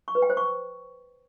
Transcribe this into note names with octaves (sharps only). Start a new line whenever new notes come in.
C#6
B4
G5
C5
C#6